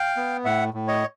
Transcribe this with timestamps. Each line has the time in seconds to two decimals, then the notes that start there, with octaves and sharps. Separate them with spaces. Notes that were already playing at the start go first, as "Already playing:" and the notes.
Already playing: F5 G5
0.17 B3
0.45 A2 E5 F#5
0.74 A2
0.88 C#5 D#5